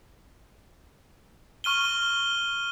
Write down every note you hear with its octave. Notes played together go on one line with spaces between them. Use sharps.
C#6 F6 D#7 G7